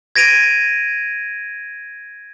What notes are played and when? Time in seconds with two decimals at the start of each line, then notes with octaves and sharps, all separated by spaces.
0.16 G#6 A#6 D7 D#7 F7